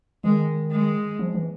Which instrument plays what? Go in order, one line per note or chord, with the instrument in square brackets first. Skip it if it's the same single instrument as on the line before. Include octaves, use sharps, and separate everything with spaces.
[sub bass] D#3 [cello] G#3
[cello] G#3
[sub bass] F3
E3